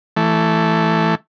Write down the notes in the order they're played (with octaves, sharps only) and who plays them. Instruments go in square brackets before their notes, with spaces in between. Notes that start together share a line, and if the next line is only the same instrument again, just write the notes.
[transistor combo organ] E3 A3